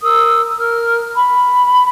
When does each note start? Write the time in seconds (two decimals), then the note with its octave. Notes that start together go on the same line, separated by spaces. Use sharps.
0.03 A#4 D#6 E6
0.57 A#4 F6
1.13 B5